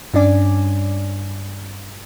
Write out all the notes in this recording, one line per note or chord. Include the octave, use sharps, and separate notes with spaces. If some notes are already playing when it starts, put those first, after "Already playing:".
G2 C#4 D4 D5 G#5